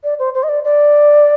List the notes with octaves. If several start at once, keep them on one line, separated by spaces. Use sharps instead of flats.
D5
C5
C5
D#5
D5
D5